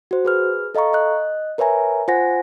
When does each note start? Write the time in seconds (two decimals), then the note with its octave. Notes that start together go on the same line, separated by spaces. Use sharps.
0.11 F#4 C5
0.25 G#4 B4 F6
0.75 A4 D#5 F5 A#5 C#6
0.93 D#5 F#6
1.58 A#4 B4 C#5 E5 G#5 A#5
2.08 F4 C5 F#5 G#5 A#6